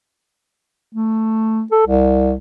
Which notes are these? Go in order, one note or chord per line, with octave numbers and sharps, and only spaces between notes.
A3
A4
C2